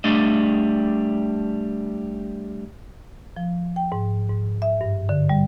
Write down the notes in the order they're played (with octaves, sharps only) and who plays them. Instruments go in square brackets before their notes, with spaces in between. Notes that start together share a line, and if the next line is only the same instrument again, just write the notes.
[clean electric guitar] G3 A3 D4 D#5
[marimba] F3
G5
G#2
G#2
E5
G2
D3
G3